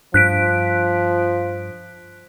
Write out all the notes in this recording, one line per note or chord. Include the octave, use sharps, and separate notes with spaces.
G2 F3 F#6 B6 D7